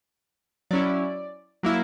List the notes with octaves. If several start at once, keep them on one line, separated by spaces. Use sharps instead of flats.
F#3 C#4 E4 D5
F#3 A#3 E4